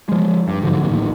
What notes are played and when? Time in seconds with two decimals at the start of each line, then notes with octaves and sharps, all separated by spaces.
0.09 F3 G#3
0.48 G2
0.62 G#2 D3 F3 F#3
0.82 A1 D#2